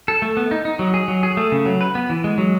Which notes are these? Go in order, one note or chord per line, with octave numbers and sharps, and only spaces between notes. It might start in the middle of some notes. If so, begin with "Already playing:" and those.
A4
A3
B3
D#4
D#4
F#3
G#4
F#3
G#4
A3
C#3
F#3
B4
B3
E3
G#3
F#3